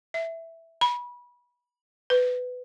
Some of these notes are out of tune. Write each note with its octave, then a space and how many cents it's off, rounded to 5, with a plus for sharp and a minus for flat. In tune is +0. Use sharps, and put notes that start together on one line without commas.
E5 +0
B5 -25
B4 +15